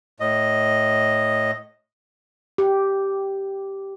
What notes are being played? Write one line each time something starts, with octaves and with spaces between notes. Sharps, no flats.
A2 D#5
G4